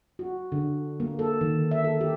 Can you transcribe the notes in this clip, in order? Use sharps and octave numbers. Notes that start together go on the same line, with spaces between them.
F#4
D3
A#3
A4
D#3
E5
A4
G4